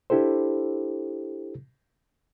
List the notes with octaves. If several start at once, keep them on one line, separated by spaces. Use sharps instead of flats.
D4 E4 G4 A4 C5